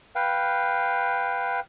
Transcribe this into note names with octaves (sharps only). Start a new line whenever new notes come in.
B4 F5 G5